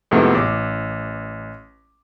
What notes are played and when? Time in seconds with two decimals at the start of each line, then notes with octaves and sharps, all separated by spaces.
0.11 F2 G#2 C3 A3 B3 E4
0.35 A1 D6